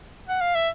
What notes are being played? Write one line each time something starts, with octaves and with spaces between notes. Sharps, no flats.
F#5
F5
E5